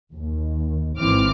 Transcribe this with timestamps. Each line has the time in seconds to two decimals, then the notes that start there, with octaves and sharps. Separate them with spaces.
0.13 D#2
0.98 G#1 E3 C4 D6 F6